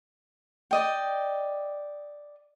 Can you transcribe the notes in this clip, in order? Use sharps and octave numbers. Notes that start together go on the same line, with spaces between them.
D5 D#5 G5